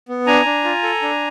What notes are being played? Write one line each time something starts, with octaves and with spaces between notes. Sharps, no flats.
B3
D4 G#5 A#5
D4
F4
A4
D4